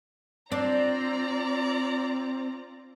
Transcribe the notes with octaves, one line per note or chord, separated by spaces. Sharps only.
C4 D4 F4 D5 A#5